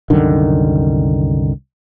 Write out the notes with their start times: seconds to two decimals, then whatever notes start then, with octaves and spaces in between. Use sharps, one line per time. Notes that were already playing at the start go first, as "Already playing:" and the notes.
0.10 C2 F#2 D3 D#3